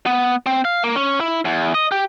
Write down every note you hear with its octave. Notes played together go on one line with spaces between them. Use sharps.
B3
C4
F5
A#3
C#4
E4
E2
D#5
G4